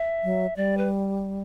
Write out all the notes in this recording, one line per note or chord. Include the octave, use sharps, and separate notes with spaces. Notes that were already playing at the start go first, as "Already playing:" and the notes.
Already playing: E5
F#3
G3 D5
B4